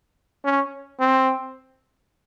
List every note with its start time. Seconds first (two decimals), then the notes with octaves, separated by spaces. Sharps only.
0.45 C#4
1.00 C4